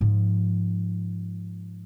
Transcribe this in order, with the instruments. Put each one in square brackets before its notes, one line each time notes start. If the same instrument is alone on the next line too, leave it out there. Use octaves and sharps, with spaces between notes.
[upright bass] G#2 F3